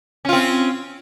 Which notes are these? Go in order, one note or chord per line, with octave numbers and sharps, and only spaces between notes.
C4 C#4 F4